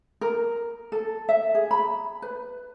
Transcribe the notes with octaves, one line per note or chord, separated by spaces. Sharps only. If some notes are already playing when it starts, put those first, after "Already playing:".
A#4
A4
E5
G#4
B5
B4